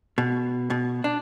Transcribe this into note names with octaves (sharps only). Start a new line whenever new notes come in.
B2
B2
D4